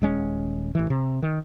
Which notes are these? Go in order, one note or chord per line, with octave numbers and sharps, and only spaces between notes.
D#1 G#3 C#4
A1 E3
C3
D#3